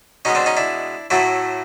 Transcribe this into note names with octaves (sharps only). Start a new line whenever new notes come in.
B2 G#3 B3 C#4 D#4
C4 D4
C#4 D#4
D4 E4
A2 F#3 A3 E4 F#4